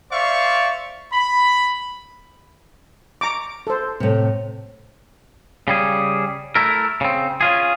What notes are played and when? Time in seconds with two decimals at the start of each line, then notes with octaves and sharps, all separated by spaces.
0.12 C5 D5 E5 F5 C#6
1.13 B5
3.21 A#5 C#6 D6
3.67 A4 C5
4.00 A2 C3
5.68 C#3 G3 G#4
6.55 A3 E4 A#4
7.01 C#3 C4
7.41 C#4 F4 G#4